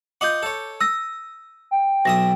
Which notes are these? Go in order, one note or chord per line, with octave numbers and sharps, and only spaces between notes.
F4 D#5 F#5 D6 G6
A4 C#5
D#6 E6 A#6
G5
B1 E5 D#6 A#6